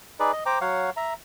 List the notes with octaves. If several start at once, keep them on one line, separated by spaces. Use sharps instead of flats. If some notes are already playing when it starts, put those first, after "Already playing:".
D#4 G#4 B4 D5
D#5
C5 G5 A#5 D6
F#3 C#5 F5 F#5
E5 A#5